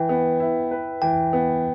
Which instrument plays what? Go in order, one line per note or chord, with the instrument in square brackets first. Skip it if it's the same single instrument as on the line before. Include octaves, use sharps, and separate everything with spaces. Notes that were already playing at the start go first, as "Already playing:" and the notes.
Already playing: [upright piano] E3 [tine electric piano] B4 G5
[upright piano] B3
E4
B4
[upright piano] E3 [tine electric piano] G5
[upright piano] B3